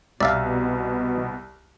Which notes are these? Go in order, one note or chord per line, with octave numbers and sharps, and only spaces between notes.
C2 B2 D5 E5 F5